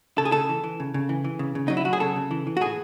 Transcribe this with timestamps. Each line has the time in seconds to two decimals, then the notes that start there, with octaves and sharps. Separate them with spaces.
0.18 C#3 A4
0.25 G#4
0.32 C#3 A4
0.49 E3
0.64 E3
0.80 C#3
0.94 C#3
1.09 E3
1.24 E3
1.39 C#3
1.55 C#3
1.68 F#3 D#4
1.77 E4
1.85 F#3 F#4
1.93 G#4
2.00 C#3 A4
2.16 C#3
2.31 E3
2.47 E3
2.57 F#4
2.61 A2 G#4